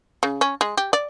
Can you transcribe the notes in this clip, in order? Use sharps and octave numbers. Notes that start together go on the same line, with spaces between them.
C#3
C#4
G#3
G4
D5